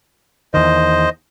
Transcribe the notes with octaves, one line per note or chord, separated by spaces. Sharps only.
E2 D#3 C5 D#5